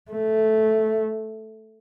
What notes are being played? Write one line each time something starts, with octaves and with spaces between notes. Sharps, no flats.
A3